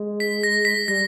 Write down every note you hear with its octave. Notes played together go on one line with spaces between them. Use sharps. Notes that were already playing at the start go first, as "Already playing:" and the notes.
Already playing: G#3
B6
A#6
B6
G3 A#6